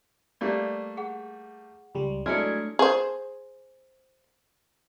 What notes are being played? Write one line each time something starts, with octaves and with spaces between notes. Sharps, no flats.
G3 A3 A#3 D5
G#4 F#5
C#2 G3
F#3 G#3 A3 D4 E4 F6 G#6 C#7
G#4 C5